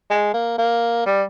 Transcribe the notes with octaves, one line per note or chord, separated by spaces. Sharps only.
G#3
A#3
A#3
G3